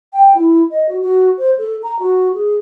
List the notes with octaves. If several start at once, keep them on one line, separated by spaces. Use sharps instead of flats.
G5
E4
D#5
F#4
F#4
C5
A4
A#5
F#4
G#4